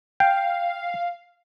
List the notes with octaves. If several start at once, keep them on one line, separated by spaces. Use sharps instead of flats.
F5 G5